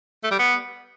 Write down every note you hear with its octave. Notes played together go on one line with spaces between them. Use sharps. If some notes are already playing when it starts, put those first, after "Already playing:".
A3
G3
B3